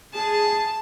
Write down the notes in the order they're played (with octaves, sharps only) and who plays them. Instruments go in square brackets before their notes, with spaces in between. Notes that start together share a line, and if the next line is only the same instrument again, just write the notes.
[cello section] G#4 [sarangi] A5